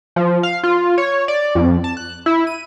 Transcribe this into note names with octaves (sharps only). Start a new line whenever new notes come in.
F3
F5
F4
C#5
D5
F2
A5
F#6
E4
D#7